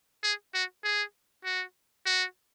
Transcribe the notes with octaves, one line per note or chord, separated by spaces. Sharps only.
G#4
F#4
G#4
F#4
F#4